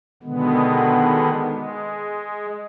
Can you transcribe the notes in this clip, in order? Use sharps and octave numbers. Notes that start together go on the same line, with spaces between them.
B2 D3 D#3 G#3 B3
G#3